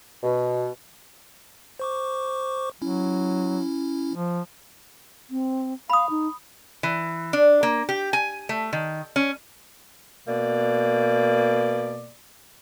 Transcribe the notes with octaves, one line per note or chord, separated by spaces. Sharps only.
B2
C5 C#6 D6
F#3 C#4 E4
F3
C4
F5 B5 D#6
D#4
E3
D4
A#3
G4
G#5
A3
D#3
C#4
B2 A#3 D5